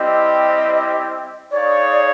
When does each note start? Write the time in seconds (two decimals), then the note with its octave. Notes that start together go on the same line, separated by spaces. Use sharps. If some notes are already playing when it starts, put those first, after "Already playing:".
Already playing: G3 C4 E4 G4 D#5
1.51 D#4 G#4 C#5 D5 F5